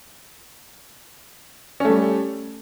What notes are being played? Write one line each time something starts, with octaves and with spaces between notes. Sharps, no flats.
G3 A3 C#4